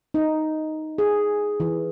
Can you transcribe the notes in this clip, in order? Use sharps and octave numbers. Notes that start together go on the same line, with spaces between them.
D#4
G#4
E3